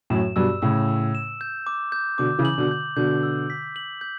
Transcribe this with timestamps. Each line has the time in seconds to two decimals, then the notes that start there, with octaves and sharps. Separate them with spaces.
0.10 F#2 A2 E7
0.36 G2 B2 E6
0.62 A2 C#3 E6
0.89 E6
1.15 E7
1.41 G6
1.67 D6
1.92 G6
2.18 B2 D3 D6
2.39 C#3 E3
2.45 F#7
2.58 B2 D3
2.71 G6
2.96 B2 D3 G6
3.23 E6
3.50 B6
3.76 F#7
4.01 G6